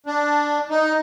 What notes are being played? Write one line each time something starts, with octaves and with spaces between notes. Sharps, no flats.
D4
D#4